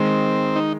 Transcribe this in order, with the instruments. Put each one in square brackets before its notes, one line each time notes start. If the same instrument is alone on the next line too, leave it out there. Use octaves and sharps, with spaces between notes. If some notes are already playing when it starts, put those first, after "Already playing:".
Already playing: [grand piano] D#3 G#3 D#4 [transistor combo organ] C4
[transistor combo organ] D#4